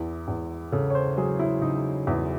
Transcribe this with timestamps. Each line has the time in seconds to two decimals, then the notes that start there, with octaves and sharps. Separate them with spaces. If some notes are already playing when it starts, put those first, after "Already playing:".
Already playing: E2 E4
0.28 E2
0.72 C#3 A4
0.90 C#5
0.95 C5
1.17 F#3 G#4
1.39 E4
1.61 C#3 D#4
2.07 E2 E4